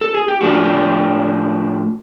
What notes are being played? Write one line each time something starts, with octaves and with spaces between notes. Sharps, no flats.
A4
G#4
G4
A2 F3 A3 D4 F4 F#4
G4